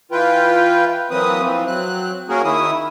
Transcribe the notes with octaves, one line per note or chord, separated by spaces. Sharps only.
E3 F4 B4 G5
E3 F#3 A#3 C4 B4 D#6
E3 F3 C4
F#3 C4 F#6
A#3 C#4 F#4 G#4 A#4
D#3 E4 D#6